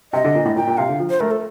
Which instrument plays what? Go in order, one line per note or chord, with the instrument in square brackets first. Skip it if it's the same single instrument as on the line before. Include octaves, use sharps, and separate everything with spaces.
[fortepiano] C3 [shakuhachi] D#5
[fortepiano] D3
A#2
A2
[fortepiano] A#2 [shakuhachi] G5
[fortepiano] A#2
[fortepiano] C3 [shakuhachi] F5
[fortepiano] D3
F3
[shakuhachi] C5
[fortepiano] A3 [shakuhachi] A#4
[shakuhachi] A4